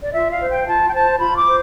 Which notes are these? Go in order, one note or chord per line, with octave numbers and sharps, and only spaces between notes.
D5
F4 E5
F5
C5
G5
F4 A5
G5
C5 A5
F4 B5
D6
C5